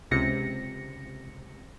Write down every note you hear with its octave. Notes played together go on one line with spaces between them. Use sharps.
C#2 C3 A#6 C#7